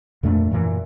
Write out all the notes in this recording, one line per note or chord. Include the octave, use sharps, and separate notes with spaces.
F2 A#2 A3 D4
F#2 A#2 E3